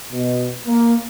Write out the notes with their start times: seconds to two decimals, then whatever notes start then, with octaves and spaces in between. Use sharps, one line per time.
0.12 B2
0.66 A#3